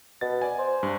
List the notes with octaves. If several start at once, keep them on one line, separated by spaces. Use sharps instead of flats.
B2 A6
D5 G#5
C5
G2